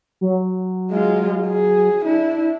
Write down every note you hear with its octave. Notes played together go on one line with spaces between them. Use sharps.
F#3
G#3 F4
G#4
D4 E4